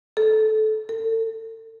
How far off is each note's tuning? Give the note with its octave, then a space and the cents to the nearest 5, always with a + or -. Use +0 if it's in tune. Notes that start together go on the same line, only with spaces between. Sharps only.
A4 -20
A4 +35